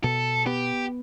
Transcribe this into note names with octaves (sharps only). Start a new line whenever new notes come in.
B2 A4
B3 G4